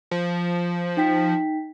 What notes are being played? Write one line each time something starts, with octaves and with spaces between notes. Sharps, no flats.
F3
D#4 G5 B6